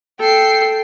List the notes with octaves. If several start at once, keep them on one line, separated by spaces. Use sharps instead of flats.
A4 G5 C7